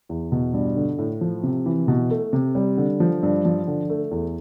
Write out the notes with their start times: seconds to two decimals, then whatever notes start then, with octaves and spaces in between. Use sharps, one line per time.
0.09 E2
0.32 B2
0.53 G2
0.76 D3
0.99 A2
1.21 F3
1.43 C3
1.66 E3
1.88 B2
2.11 A3
2.33 C3
2.55 G3
2.77 D3
3.00 F3
3.23 G2
3.45 F3
3.67 D3
3.90 A3
4.11 E2